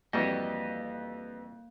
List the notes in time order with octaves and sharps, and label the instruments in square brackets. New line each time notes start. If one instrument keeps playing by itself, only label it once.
[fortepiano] F2 [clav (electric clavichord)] E3 G3 F#4 [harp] A#3 [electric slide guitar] G4 B4 D#5